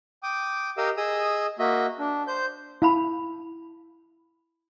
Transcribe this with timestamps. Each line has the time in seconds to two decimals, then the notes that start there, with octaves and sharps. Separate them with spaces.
0.23 G5 D6 D#6
0.77 G4 A#4 D#5 F5 D#6 E6
0.97 G#4 D#5 D#6 E6
1.59 A#3 F#4 D#5 E5
1.99 D4
2.28 C5 G6
2.82 E4 F5 A5 B5